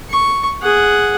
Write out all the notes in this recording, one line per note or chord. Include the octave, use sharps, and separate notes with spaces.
C#6
G#4 F#5